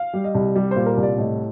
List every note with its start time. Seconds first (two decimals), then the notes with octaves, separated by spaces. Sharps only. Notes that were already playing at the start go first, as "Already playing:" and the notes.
Already playing: F5
0.14 G3
0.24 D#5
0.34 C2
0.56 G3
0.71 A#2 C5
0.86 A#4
0.97 C2
1.03 D5
1.18 A2 D#5